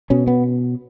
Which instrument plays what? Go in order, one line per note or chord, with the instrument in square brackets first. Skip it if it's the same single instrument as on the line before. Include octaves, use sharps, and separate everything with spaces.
[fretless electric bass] B2 C#4
B3